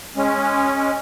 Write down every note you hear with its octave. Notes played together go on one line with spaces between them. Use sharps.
G#3 C#4